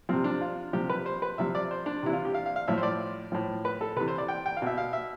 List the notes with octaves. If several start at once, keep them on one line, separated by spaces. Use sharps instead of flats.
C3 F3 C4
D4
F4
C3 F3 G4
B4
C5
B4
C3 F3 E5
D5
C5
D4
C3 E3 E4
F4
G4
F5
F5
F5
A2 F3 E5
C5
D5
A2 F3
B4
A4
C3 E3 B4
C5
D5
G5
G5
F5
B2 E5
F5
E5